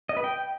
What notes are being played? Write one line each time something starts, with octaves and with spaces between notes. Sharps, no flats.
D#5
B4
G5